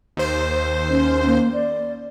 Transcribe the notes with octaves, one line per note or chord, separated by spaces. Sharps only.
D#2 C5
C#4
A#3
D5